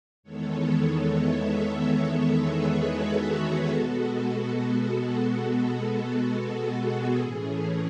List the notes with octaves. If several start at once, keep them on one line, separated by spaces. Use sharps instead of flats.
E2 D#3 G#3 B3 A4 C#5
C#5 E5
A4 C#5
G#4 B4
F#4 A4
G#4
B2 G#3 B3 F#4 A4
G#4
A2 E3 A3 C#4